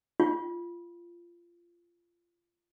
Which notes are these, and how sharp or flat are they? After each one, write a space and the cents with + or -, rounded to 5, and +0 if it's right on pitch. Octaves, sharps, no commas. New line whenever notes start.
F4 -15